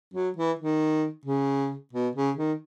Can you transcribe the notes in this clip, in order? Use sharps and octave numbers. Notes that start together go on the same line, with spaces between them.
F#3
E3
D#3
C#3
B2
C#3
D#3